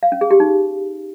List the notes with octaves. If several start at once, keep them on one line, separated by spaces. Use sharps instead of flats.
F5
C#4
G#4
G4
D#4